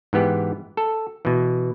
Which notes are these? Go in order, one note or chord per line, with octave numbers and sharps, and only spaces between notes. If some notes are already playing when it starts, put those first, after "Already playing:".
G#2 E3 B3 G4
A4
B2 E3